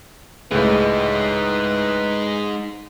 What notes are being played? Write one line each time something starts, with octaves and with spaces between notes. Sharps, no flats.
C#2 A2 G#3 D#4 G#4 B4